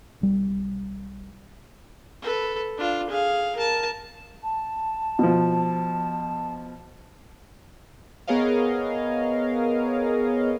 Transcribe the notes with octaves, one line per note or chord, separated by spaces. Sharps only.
B1 G3
A4 B4
D4 F4
G#4 F5
A#4 A5
A5
B2 F3
B3 G#4 A#4 C#5 D#5 F5